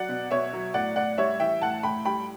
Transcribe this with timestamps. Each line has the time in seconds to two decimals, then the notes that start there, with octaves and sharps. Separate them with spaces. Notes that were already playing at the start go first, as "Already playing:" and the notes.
Already playing: F#3 D5 F#5
0.09 B2
0.30 B2 C#5 E5
0.53 F#3
0.74 A2 D5 F#5
0.96 A2 D5 F#5
1.18 G3 C#5 E5
1.40 E3 E5 G5
1.61 A2 F#5 A5
1.83 A2 G5 B5
2.05 G3 G5 B5